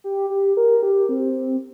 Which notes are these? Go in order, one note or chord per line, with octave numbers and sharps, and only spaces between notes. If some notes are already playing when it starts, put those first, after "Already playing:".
G4
G4
A#4
G4
C4